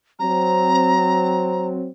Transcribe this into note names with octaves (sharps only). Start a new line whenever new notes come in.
F#3 C4 A#5